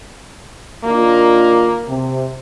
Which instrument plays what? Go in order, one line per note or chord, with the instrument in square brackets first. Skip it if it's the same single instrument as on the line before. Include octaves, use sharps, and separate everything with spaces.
[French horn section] D#3 D4 F4 [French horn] A#3
[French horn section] C3